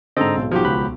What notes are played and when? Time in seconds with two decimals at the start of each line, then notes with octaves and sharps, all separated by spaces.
0.17 G#2 D3 C4 A4 D#5 A#5
0.37 B1 G#2
0.51 F3 F#3 G4
0.65 C#2 B5 F#6